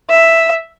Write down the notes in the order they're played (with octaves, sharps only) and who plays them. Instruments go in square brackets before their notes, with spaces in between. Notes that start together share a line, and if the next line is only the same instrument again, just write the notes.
[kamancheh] E5